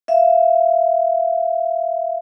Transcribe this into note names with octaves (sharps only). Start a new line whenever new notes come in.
E5 F5